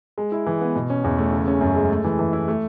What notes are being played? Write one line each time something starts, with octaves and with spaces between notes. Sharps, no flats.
G#3
E4
E3
B3
B2
C#4
E2
A3
C#3
C#4
F#2
G#3
A3
E3
E3
E4
A3